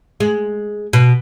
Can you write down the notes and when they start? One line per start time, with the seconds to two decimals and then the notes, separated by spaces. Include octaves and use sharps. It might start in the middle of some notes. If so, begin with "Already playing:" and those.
0.20 G#3
0.93 B2